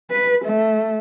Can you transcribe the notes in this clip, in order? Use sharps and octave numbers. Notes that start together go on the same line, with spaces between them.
B4
A3